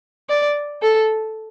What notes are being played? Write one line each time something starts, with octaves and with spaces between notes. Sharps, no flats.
D5
A4